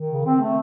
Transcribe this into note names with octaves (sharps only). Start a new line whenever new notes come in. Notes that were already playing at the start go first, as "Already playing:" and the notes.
Already playing: D#3
C#3
C4
A3